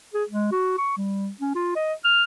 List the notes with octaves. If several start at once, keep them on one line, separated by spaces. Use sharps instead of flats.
G#4
G#3
F#4
C#6
G3
C#4
F4
D#5
F6